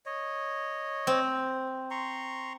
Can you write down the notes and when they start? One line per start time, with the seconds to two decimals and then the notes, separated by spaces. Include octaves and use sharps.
0.06 C#5 D#5
1.07 C4
1.91 A#5 C6 C#6